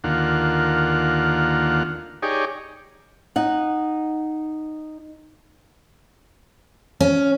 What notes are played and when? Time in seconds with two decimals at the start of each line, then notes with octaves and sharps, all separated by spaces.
0.04 D#2 D3 A#3 F4 F#5
2.22 D#4 G4 G#4 C#5 D5
3.36 D#4 F#5
7.00 C#4